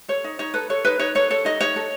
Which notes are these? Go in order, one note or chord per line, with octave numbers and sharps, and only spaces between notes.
A4 C#5
D#4
D#4 C#5
A4 B4
A4 C#5
D#4 B4
D#4 C#5
A4 C#5
A4 C#5
D#4 D#5
D#4 C#5
A4